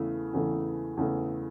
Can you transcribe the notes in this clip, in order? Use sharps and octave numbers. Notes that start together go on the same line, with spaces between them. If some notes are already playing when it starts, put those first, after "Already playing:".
Already playing: E2 C#3 E3 A3
E2 C#3 E3 A3
E2 C#3 E3 A3